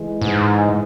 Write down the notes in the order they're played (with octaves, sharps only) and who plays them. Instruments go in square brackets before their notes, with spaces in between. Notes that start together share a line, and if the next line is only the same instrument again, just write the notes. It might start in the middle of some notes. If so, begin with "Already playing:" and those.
Already playing: [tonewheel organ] E3 G#3
[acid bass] G#2